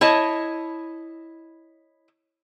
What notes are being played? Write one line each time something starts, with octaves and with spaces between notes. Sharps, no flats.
E4 C#5 D#5 A5